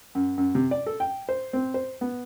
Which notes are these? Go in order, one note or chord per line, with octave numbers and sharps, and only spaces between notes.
F#2
F#2
C3
D5
A4
G5
C5
C4
C5
B3